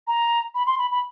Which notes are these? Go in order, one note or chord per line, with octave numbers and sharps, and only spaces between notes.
A#5
B5
C6
B5
B5